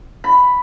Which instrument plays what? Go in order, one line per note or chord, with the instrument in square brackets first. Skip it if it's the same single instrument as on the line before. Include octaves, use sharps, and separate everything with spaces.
[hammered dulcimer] B5